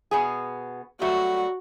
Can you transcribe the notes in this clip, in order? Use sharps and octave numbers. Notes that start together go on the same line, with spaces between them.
B2 B3 G#4
F#3 G3 A3 F#4